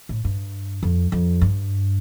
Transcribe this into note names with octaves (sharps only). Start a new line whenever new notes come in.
A2
G2
F2
F2
G2